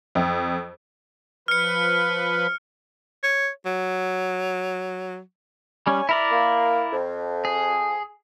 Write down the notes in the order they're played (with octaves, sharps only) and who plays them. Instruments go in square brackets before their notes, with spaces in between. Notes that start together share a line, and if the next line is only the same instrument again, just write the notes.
[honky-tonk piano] F2
[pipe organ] F3 B4 [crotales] F6 C#7
[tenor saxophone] C#5
F#3
[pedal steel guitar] G3 C#4 [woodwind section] C#5 G#5
[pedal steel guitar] E4 A#4 D5 [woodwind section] E5 B5
[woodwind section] A#3
F2
[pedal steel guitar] G#4